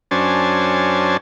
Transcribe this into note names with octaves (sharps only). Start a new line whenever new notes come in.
F#2 C#4 D4 C5 G#5 A5